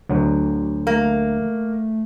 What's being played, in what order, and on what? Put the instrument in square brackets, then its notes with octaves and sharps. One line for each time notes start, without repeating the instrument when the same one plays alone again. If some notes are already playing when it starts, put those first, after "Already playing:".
[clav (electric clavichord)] D2 F#3
[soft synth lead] A3 [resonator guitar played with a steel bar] A#3